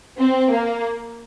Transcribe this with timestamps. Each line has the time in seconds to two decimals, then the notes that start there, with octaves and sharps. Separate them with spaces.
0.18 C4
0.52 A#3